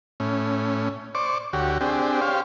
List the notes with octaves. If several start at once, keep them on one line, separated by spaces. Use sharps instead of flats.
A2 C#4
C5 D5 C#6 D6
D2 F#4 G4 C#5
C4 D4 G4 G#4
G4 C5 C#5 F5